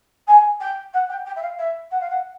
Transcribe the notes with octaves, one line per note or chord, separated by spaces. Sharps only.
G#5
G5
F#5
G5
G5
E5
F5
E5
F#5
F5
F#5